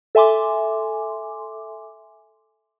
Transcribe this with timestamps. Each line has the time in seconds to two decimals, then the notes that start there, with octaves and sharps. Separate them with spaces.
0.15 A4 E5 G#5 C6 D6